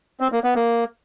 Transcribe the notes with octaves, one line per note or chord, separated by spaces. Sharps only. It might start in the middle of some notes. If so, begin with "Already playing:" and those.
C4
A#3
B3
A#3